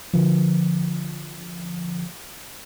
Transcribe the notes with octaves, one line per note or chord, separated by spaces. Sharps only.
D3 F3